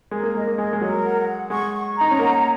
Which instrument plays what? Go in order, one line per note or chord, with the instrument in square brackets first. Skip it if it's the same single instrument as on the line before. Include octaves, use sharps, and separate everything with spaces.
[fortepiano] G#3 [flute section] A#4
[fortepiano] A#3
[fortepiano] G#3 [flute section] D#5
[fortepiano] A#3
[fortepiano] G#3 [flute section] A#4
[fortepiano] G#3
[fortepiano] F#3 [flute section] A#4
[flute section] F#5
F#5
[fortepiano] G#3 [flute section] C#6
[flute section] C#6
[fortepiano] D#4 [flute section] A#5
[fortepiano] C#4
[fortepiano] A#3 [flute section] F#5